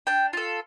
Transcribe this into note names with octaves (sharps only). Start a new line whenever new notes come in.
D4 G5
F4 A4